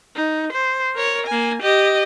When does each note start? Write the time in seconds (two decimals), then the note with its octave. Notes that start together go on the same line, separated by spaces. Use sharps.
0.16 D#4
0.52 C5
0.95 A#4 C#5
1.27 A#3 G#5
1.62 G4 D#5